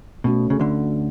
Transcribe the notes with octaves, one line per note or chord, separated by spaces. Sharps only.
B2 A3 C#4 F#4
C#3
D2 D3